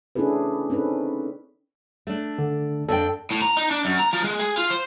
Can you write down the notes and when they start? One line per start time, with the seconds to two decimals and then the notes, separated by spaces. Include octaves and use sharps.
0.15 C#4 D4 E4 G#4 A4 B4
0.70 C4 C#4 D#4 A4 B4
2.07 A3 D4
2.38 D3
2.89 F2 D4 A4 G5
3.31 A2
3.42 A#5
3.57 D#4
3.71 D4
3.85 F#2
3.99 A#5
4.13 F3
4.24 G#3
4.39 G#4
4.58 F4
4.70 C5